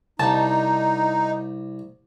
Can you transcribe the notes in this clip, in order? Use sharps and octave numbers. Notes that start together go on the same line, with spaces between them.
C2 D#4 A5